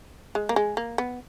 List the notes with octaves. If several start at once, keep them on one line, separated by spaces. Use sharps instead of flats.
G#3
A#3
G#3
A#3
B3